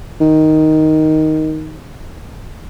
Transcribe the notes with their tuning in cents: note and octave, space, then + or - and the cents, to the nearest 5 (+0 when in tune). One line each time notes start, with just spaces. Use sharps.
D#3 +5